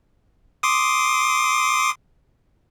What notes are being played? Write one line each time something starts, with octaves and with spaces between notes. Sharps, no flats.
C6 D6 D#6